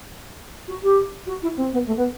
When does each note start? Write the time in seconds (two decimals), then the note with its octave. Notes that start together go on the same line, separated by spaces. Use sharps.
0.67 F#4
0.83 G4
1.26 F#4
1.42 E4
1.57 C4
1.72 B3
1.86 A3
1.97 B3